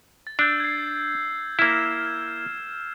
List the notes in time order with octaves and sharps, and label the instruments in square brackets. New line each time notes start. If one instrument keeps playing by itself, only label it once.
[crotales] A6
[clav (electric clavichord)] D4 [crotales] E6 G6
[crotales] G#6 C7
[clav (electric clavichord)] A#3 E4 [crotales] F6 G#6 E7